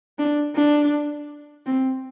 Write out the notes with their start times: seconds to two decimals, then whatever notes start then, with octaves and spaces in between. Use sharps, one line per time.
0.18 D4
0.56 D4
1.66 C4